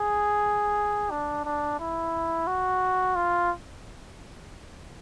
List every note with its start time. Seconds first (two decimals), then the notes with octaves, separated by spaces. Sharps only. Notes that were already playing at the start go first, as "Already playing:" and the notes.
Already playing: G#4
1.11 D4
1.45 D4
1.79 E4
2.47 F#4
3.16 F4